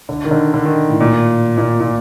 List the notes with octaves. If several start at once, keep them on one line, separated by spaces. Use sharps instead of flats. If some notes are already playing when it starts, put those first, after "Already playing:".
D3
D#3
D3
D3
D#3
A2
A#2
A#2
A#2